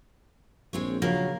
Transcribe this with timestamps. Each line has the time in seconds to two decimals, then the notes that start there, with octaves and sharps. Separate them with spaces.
0.73 A#1 G#3 C4 C#5
1.02 C#3 F3 F#3 A#3